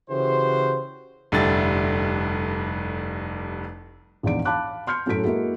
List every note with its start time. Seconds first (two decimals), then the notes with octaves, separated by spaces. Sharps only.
0.10 C#3 E3 F#4 G4 C5
1.32 F1 G2 D3 G3 E4 A6
4.23 A#1 E2 G#2 D5 D7
4.45 F5 A5 B5 D6 F#6
4.87 C6 F6 G6 C#7
5.06 F#2 A2 F#4 A4 B6 D7
5.24 G#3 A#3 E4 F#4 G#4